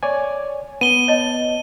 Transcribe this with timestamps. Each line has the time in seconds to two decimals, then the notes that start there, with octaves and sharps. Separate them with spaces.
0.03 C#5 D5 G#5
0.81 B3 D#7 G7
1.08 C#5 D#5 A5